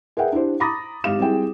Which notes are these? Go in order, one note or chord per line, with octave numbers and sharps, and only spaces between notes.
G#4 A#4 B4 E5 F#5 G5
D4 E4 G4 C5
A#5 B5 D6 D#6 A6 A#6
G#1 G4 F5 E7
G3 C4 E4 G#4 G5